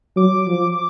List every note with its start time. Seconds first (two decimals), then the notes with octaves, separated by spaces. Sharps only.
0.16 F#3 D6
0.48 F3